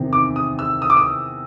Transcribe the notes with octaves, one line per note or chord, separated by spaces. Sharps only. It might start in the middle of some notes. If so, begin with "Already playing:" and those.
Already playing: E2 C3 D#3
D6
D#6
E6
D#6
D6
D#6